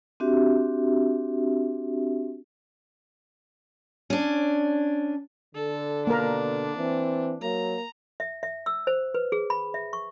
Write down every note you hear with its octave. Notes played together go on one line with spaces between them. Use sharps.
C4 D4 F#4 G4 E5
C#4 D4
D3 A4
B2 A#3 D4 A#4
E3 C4
F#3 A#3 A#5
E5
E5
E6
C5
B4
G#4
B5
E5
C#6